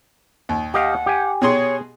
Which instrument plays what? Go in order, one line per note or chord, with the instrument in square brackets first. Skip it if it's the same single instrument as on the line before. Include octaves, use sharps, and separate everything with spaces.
[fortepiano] D#2
[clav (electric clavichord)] G4 D#5 F5 [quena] F#5
[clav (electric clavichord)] G4 G#5
[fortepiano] B2 G#4 C6 [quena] C#5